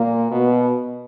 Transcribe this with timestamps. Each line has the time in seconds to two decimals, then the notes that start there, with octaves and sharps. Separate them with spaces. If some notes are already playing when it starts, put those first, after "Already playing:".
Already playing: A#2 A#3
0.32 B2 B3